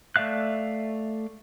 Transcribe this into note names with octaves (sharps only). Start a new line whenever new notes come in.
A3 D5 E5 F5 F#6